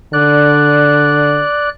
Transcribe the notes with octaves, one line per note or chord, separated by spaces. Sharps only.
D3 D5 F#6